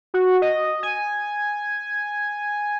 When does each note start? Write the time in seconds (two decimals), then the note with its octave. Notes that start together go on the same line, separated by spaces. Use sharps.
0.14 F#4
0.42 D#5
0.83 G#5